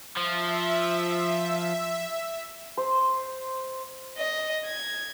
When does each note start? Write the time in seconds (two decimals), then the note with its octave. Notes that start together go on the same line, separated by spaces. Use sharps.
0.17 F3 E5
2.77 C5
4.18 D#5
4.65 G#6